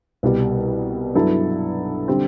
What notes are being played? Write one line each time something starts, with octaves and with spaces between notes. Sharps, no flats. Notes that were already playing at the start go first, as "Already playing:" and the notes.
C2 B2 G3
G2 F#3 B3 E4 A4
D3 G3 C4